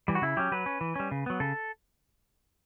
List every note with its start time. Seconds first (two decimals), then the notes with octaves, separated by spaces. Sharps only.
0.08 E3 G3
0.15 F#4
0.22 C#3 E4
0.37 F#3 C#4 G4
0.52 F#3 B4
0.66 C#4
0.81 E3
0.96 G3 C#4
1.11 C#3
1.26 F#3 B3
1.40 C#3 A4